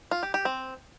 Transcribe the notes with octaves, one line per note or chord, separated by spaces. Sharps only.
F4
G4
G4
C4